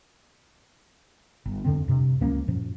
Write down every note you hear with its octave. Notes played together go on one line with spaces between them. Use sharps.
G1
F2 D3 C4
G2 C3
C#2 F3 A#3 C#4
F#2 A#2 F3